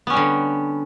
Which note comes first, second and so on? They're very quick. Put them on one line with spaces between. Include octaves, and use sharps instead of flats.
B3 C#4 G3 D3